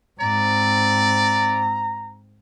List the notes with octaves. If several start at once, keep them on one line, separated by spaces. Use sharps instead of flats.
G#2 C4 D5 A#5